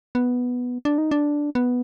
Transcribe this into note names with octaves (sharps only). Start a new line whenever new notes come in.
B3
D4
D#4
D4
B3